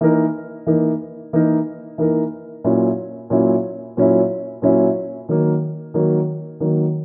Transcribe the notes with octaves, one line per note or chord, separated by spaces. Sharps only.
E3 A#3 D#4 A#4
E3 A#3 D#4 A#4
E3 A#3 D#4 A#4
E3 A#3 D#4 A#4
A#2 F#3 C#4 E4
A#2 F#3 C#4 E4
A#2 F#3 C#4 E4
A#2 F#3 C#4 E4
D#3 F#3 A#3
D#3 F#3 A#3
D#3 F#3 A#3